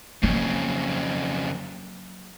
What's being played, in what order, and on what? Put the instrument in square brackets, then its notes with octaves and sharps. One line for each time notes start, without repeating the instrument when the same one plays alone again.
[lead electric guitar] F2 C#3 [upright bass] F#3 A#3